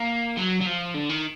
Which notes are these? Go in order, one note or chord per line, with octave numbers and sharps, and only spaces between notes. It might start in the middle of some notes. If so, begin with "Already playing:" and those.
Already playing: A#3
F#3
F#3
F3
D3
D#3